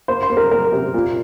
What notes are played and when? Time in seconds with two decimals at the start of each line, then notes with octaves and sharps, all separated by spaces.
0.08 A#3 C5
0.23 C5
0.30 A#3
0.37 A#4
0.51 A#3 A#4
0.73 C3
0.94 A#2